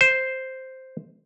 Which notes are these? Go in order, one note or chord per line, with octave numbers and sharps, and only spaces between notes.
C5